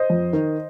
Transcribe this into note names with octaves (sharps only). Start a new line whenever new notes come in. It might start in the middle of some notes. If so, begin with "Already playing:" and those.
Already playing: C5 D#5
F2
D#3